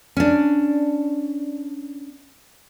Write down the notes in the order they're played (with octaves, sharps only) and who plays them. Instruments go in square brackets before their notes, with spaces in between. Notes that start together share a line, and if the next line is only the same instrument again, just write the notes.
[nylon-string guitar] C#4 D4